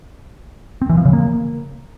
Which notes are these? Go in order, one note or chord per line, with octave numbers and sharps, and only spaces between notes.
C4
E3
F3
C#3
A#3